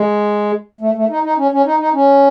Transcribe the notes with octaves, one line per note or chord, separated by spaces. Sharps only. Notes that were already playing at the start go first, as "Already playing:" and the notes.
Already playing: G#3
A3
A3
D#4
D#4
C#4
C#4
D#4
D#4
C#4